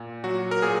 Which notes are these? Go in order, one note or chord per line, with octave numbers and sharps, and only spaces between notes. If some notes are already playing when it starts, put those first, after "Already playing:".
Already playing: A#2
F#3 F#4
A#4
A#2 G#4